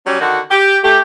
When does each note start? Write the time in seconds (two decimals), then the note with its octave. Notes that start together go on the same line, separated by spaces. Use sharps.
0.06 F#3 G3 C#4
0.21 D3 D#3 F#4
0.51 G4
0.84 A3 G4